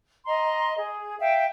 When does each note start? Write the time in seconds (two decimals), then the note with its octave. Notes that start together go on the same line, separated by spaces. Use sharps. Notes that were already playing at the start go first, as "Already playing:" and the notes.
0.25 D#5 A#5 C6
0.77 G#4
1.19 E5 F5 G5